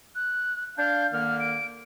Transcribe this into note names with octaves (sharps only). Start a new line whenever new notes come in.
F#6
D4 F5 G6
D3 D#3 A#3 F6
D7